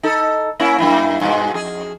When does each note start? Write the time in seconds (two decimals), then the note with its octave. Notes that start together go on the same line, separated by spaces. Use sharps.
0.03 D#4 A4
0.59 A#3 C#4 E4
0.78 F#2 A#3 E4
1.21 G2 B2 G#3
1.54 F2 G#4